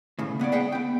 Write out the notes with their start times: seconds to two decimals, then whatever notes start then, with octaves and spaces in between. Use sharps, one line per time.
0.19 A2 C#3
0.39 A#3 B3 C#5 D5
0.52 G#4 E5 F#5 G5
0.72 B3 G5